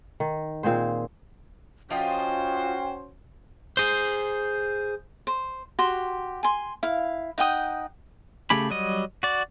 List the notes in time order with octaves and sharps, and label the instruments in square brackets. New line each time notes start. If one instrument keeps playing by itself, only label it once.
[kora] D#3
A#2 C4 G#4 C5
[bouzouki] F3 F4 D#5 [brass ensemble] C#4 F#4 C5 [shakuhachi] G5
[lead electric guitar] G#4 C5
[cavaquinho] C5
F#4 G4 C6
G#5 C6
E4 F5
D#4 F#5 G5 D#6
[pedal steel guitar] C#3 A3 G4 G#4 B5
F#3 G3 D#5
F#4 D5